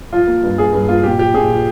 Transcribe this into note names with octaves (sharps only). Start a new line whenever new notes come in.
F3 F4
A#3
G2
A#3 G#4
G2
A#3 F4
A#2 G4
F3 G4
A#2 G#4
F3